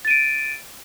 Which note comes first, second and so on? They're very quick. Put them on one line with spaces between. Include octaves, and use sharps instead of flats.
A6 D#7 D7